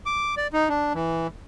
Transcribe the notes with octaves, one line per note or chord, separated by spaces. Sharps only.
D6
D5
D#4
D4
E3